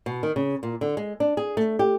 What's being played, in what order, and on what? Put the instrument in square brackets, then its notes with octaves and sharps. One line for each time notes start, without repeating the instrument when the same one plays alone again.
[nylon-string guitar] B2
D#3
C#3
A#2
D3
G#3
D4
G#4
A3
G4